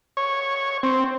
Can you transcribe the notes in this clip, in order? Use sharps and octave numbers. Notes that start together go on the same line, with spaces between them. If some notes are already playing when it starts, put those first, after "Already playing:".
C#5
C4